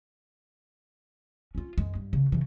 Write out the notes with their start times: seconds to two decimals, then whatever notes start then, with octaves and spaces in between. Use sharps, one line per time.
1.55 C#4 F4
1.78 F#2 G#3
1.95 G2
2.13 C#3
2.32 C#3 E3